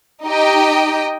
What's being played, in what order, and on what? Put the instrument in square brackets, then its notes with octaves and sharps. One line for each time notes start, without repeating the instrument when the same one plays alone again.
[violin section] D#4 G4 D#5 G5